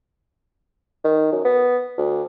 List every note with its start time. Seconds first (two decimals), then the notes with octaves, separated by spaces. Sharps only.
1.04 D#3
1.32 F#2
1.45 B3
1.98 D2